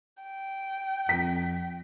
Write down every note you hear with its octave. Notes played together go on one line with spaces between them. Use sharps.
G5
F2 B6